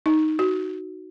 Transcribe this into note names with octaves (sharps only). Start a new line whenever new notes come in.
D#4
F#4